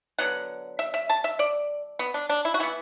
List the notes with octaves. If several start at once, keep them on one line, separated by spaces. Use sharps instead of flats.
D3 F#3 B3 F#5
E5
E5
A5
E5
D5
B3
D4
D4
E4
F#4
E3 B3 E4